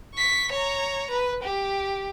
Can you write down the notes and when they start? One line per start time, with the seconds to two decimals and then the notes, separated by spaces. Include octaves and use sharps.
0.15 C#6 B6
0.53 C#5 A#5
1.10 B4
1.43 G4